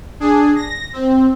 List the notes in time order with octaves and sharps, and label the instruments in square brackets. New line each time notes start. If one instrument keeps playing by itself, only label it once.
[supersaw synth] D4 G#4
A#6
C4